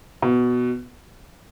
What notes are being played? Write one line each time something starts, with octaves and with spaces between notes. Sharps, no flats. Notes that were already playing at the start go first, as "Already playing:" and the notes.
B2